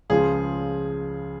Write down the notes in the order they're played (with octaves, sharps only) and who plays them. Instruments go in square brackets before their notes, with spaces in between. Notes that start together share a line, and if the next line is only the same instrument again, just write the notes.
[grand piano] C#2 C#3 F3 G#4